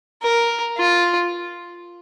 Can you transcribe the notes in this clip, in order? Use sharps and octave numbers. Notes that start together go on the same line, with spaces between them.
A#4
F4